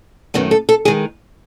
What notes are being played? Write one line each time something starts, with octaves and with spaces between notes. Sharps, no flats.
F#2 D#3 A3 B3
A4
A4
D#3 G#3 G#4